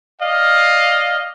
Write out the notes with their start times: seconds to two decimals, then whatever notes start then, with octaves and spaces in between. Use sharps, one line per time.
0.22 D5 D#5 F5